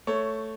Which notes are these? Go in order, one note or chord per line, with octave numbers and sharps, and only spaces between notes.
A3 C#5